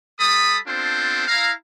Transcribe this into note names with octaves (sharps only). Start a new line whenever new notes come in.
G3 A4 B5 D#6
B3 C4 D4 F4 A4 C5
E4 F5 A#5